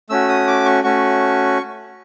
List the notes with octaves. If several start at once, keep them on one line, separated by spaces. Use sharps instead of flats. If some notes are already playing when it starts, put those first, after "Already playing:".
A3 C#4 F#4 E6
D#6
D6
C#6
A3 C#4 F#4 C#6